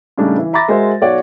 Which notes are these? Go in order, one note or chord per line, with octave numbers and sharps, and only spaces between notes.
A2 C#3 G3 D4 D#4
E3
E5 A#5 B5 D6 A6 A#6
G#3 F#4 A#4 C5 E5
B1 F#4 C#5 D5 F#5